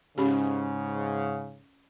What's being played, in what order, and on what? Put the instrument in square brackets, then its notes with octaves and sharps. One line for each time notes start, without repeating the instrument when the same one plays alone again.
[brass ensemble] G#2 C#3 [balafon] C#4 G4